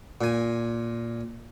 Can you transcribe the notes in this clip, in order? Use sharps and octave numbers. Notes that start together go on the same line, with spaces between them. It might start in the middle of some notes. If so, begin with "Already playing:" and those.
A#2 G#5